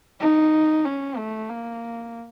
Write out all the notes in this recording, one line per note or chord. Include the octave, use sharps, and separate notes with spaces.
D#4
C#4
A3
A#3